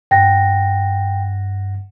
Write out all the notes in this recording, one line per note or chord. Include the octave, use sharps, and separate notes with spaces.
G2 F#5 G5 A#6